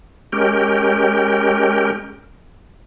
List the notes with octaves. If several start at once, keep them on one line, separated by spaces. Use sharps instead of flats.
G#3 C#4 G4 A#4 G5